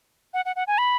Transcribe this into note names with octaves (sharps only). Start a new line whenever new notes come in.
F#5
F#5
F#5
G#5
B5